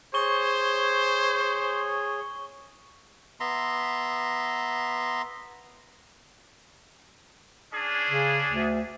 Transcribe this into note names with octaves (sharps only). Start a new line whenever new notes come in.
G#4 C5 C#5 C#6 G7
B3 E5 A#5 C6
C#4 D4 G#4
C#3
D2